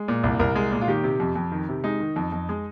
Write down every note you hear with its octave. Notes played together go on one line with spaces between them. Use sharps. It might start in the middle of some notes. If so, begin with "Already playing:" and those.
Already playing: G#3
A#2
C2
C2 A#4
G#3
A#2
F4
D#3 G4
C3
F2
F2
D#3
C3
G#3 D#4
D#3
F2
F2
G#3